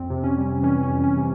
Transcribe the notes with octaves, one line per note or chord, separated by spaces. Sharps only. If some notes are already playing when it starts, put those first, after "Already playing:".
Already playing: F2 C4
C3
C#4
G3
E3 C#4
C#4
F2
C#4
C3